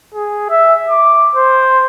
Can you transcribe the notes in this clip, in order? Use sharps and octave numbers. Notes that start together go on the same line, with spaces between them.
G#4
E5
D6
C5